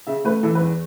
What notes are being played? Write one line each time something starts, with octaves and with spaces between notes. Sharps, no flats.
C#3 E5
A3 B4
E3 A4
B4
E2